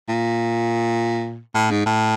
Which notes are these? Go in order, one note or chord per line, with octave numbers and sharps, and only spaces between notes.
A#2
A2
G#2
A2